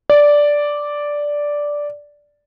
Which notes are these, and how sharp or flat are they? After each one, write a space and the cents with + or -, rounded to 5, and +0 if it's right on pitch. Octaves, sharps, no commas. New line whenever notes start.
D5 -5